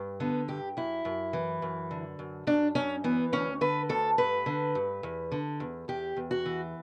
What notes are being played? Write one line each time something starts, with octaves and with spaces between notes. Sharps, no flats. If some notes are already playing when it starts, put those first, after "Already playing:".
Already playing: G2
D3 B3
G2 G4
F#2 E4
F#2
E3
F#2
D3
F#2
F#2 D4
F#2 C#4
E3 B3
D2 C#4
D3 B4
D2 A4
G2 B4
D3
G2
E2
D3
E2
E2 G4
E2
F#4
E3